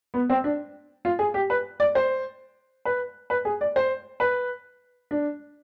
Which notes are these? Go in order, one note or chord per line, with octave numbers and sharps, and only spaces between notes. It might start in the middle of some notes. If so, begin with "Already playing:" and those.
B3
C4
D4
F4
G#4
G4
B4
D5
C5
B4
B4
G#4
D5
C5
B4
D4